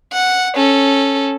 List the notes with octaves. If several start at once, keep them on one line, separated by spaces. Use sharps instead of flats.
F#5
C#4 A4